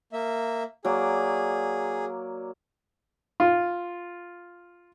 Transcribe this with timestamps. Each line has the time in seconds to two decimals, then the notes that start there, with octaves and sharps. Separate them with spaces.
0.13 A#3 E5
0.85 F#3 A#3 G#4 D5
3.40 F4